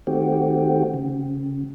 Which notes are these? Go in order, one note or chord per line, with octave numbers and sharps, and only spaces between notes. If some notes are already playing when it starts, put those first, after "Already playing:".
D#3 A3 C4 F#4 G4
C#3